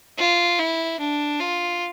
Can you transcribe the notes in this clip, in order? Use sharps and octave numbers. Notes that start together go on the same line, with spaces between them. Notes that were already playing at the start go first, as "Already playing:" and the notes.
F4
E4
D4
F4